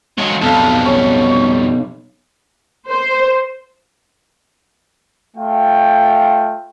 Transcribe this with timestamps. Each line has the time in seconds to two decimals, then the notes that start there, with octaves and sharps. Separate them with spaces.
0.18 F3 F#3 G#3 C#5
0.41 B1 F2 G3 A4 F5
0.69 F5
0.85 C#4 C#6
2.88 C5
5.36 A3 F4 G5